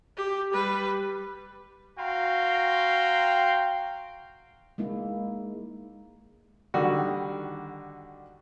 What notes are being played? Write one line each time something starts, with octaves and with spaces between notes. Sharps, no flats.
G4
G3 B4
F#4 F5 G5 A#5 C6
G#3 A#3 D#4 E4
D3 D#3 G3 F#4